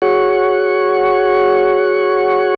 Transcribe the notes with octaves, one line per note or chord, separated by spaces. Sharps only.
F#4 G#4 C#5 F#5 C#6